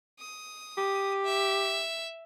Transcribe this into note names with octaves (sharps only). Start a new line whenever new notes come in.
D#6
G4
E5